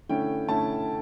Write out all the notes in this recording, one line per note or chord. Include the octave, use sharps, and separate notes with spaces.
D3 A3 C#4 E4 G5
D3 A3 C#4 E4 A5